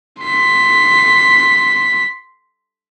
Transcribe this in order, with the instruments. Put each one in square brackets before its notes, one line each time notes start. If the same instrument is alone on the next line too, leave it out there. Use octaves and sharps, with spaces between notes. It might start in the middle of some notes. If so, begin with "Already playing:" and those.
[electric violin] C6 B6